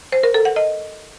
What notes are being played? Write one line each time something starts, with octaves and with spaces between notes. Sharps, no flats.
C5
A#4
A4
F#5
D#5